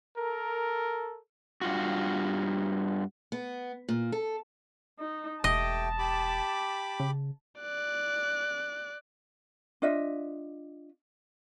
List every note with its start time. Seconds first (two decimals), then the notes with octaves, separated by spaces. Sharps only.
0.16 A4 A#4
1.61 G2 F4 F#4
3.32 B3
3.89 A#2
4.12 A4
4.99 D#4
5.44 E1 A3 G4 D#5 G5 A5
5.99 G4 B5 D6
7.00 C#3
7.61 D5 F#6
9.82 D4 F4 D#5 E5